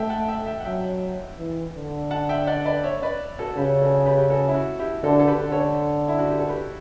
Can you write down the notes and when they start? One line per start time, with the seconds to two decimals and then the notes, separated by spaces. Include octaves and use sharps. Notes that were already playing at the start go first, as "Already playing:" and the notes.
Already playing: A3 E5 G5
0.10 F#5 A5
0.28 E5 G5
0.46 E5 G5
0.60 F#5
0.65 F#3 E5 G5
1.38 E3
1.75 D3
2.11 F#5 A5
2.29 E5 G5
2.47 D5 F#5
2.66 B4 D5
2.83 C#5 E5
3.02 B4 D5
3.39 F#4 A4
3.57 C#3 G4 B4
3.81 F#4 A4
4.06 G4 B4
4.18 G4
4.30 F#4 A4
4.48 E4
4.54 F#4
4.79 E4 G4
5.03 D3 F#4 A4
5.19 A4
5.27 G4 B4
5.40 D3
5.52 A4 C#5
6.08 E4
6.19 F#4
6.29 G4
6.39 A4
6.49 G4 B4